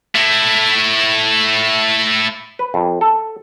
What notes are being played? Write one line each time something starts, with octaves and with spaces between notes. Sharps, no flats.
A3 E4
B4
F2
A4